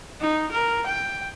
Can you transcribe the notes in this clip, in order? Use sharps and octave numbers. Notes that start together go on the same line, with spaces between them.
D#4
A#4
G5